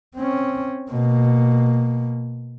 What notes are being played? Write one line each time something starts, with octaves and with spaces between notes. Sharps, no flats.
C4 C#4
B2 A#3